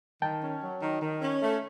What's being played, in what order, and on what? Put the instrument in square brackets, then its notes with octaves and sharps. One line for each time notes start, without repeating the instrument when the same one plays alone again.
[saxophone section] D#3 [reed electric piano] G5 A5
[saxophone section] C#4
F#3
D#3
D#3
C#4
A3